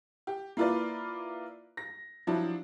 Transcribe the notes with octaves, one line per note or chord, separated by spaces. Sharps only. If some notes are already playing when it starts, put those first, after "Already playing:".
G4
A#3 E4 F4 B4 D5
A#6
F3 F#3 D4 E4